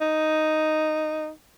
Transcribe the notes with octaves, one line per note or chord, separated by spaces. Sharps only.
D#4